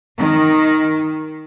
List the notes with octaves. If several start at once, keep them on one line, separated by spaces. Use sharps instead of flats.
D#3